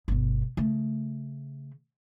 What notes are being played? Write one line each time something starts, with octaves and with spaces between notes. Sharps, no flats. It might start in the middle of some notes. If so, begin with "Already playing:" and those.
G1 B2
C#3 A3